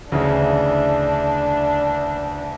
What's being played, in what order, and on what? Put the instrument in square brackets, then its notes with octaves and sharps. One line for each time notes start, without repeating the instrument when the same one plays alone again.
[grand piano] D2 C#3 E3 [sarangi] D4